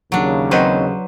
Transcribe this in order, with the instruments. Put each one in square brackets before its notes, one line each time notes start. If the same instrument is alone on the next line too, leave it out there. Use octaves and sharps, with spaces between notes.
[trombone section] D#2 C#3 [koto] F#3 D4
[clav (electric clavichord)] D#3 C4 [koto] F#3 B4 C5